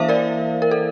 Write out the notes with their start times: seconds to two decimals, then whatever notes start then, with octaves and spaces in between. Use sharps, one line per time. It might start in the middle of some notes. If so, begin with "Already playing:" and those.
Already playing: E3 A#3 E4 C5 E5 F5
0.09 A#4 D5
0.62 A#4
0.71 A4